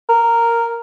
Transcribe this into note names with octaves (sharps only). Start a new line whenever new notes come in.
A#4